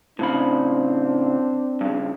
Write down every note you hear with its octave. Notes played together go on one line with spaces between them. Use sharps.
A2 C#3 C4 D4 B5
G2 C#3